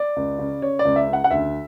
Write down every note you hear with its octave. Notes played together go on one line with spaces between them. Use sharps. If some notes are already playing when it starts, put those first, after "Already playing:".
Already playing: D5
C#2
C#3
C#3 C#5
D5
C#2
E5
C#3
F#5
F#5
D2 E5